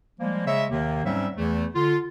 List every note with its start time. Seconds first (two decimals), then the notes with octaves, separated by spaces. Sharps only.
0.20 F3 G3 G#3 A#3
0.46 C#3 G#3 C#5 D#5 E5
0.70 D#2 C3 D#3 A#3
1.04 G#2 F#3 G3 C4 C#4 E5
1.37 E2 E3 A3
1.75 D3 F4